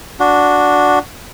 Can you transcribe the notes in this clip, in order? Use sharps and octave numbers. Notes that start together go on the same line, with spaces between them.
D4 F#4